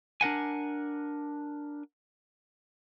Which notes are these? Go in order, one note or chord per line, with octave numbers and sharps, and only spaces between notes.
D4 A#4 F#5 G#5